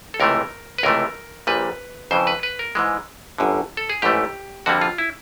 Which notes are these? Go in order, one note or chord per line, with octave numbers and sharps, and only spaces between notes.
A4
C#2 C3 E3 A3 A#4
B4
C#2 C3 E3 A3 A#4
A#1 A#2 G3 B4
F2 C#3 E3 C5
B4
B4
A#4
G#2 E3 G#3
G1 F#2 D3
A4
G#4
A1 G#2 E3 A3 G4
F2 D3 G3 A#3 F#4
F4
E4